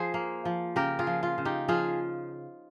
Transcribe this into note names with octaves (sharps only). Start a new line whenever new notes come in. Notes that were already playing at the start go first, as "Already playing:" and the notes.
Already playing: F3 G#4 C5
A#3
F3
C#3 G4 A#4
F4 G#4
F3
F4
C#3
D#4 G4
F3 F4 G#4